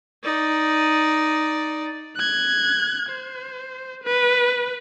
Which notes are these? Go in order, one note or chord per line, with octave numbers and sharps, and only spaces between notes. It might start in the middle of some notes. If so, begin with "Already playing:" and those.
D#4 D5
F#6 G#6
C5
B4